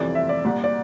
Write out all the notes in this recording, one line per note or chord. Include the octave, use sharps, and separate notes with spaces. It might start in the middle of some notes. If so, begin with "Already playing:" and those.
Already playing: G1 F2 C3 E3 D5
E5
D5
C2 A#2
D5